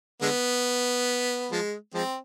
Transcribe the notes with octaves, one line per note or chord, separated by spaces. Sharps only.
D3 G#3 B3
F3 G#3
F3 G#3 C4